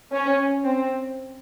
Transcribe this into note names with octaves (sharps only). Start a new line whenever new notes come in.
C#4
C4